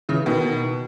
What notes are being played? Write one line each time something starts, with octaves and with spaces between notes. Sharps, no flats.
C#3 E3
B2 D#3